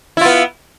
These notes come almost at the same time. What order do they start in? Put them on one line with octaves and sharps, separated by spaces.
E4 F4 B3